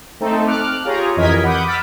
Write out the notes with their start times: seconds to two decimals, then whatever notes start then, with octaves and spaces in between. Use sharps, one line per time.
0.20 A3 C4 D#4 A4
0.46 D6 F6 F#6
0.84 F4 G4 G#4 C#5 A#5
1.16 F2 E3 A#4 D#5 G#6 B6
1.44 F#5 B5 D6 D#6 G6
1.66 E6 F6 A6 B6 D7